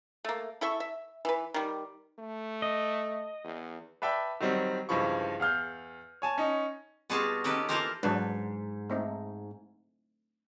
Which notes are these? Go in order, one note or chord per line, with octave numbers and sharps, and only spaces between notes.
A3 A#3
E4 A4 E5 C#6
E5
E3 B4
D#3 G3
A3
D#5
E2
B4 D5 E5 G5 A5 B5
D#3 F#3 G3 C4
C#2 G2 E3 F3 B5 C#6
E2 F5 F6 G6
C#5 G#5 A5
C#4 D#4
B2 G3 F4 F#4 G#4 A5
D#3 C#4 G4 A4 B4
E3 A#3 F4 A4 A#4 C5
G#2 F#3 D4 B4
A3 C4 D#4